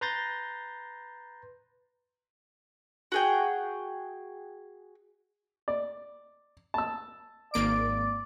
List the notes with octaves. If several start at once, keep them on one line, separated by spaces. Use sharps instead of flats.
B4 A#5 C6 G6 A6 A#6
F#4 G#4 G5
D5
A5 E6
G#1 A#3 D5 D7